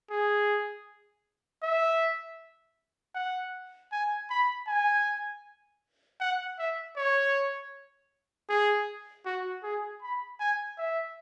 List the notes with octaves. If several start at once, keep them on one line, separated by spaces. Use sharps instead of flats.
G#4
E5
F#5
G#5
B5
G#5
F#5
E5
C#5
G#4
F#4
G#4
B5
G#5
E5